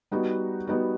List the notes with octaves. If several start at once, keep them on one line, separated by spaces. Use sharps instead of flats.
G3 B3 D#4 F#4
G3 B3 D#4 F#4